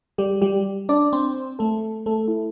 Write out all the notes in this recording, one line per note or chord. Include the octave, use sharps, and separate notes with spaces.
G3 G4
G3 G4
D4 D5
C4 C5
A3 A4
A3 A4
E4